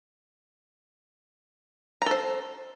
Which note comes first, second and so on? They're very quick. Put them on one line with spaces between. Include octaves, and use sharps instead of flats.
A#5 A4 C5